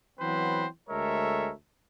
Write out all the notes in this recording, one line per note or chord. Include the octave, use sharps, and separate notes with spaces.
E3 F#3 B3 C4 B4 C5
D2 G#3 A4 A#4 C#5 E5